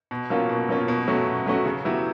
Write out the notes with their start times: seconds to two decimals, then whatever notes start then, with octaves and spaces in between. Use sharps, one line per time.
0.11 B2
0.30 F#3 A#3 C#4 F4
0.49 B2
0.69 F#3 A#3 C#4 F4
0.88 B2
1.07 F#3 A3 C#4 F#4
1.27 B2
1.46 F#3 A3 C#4 F#4
1.66 C#3
1.85 F#3 B3 E4 G4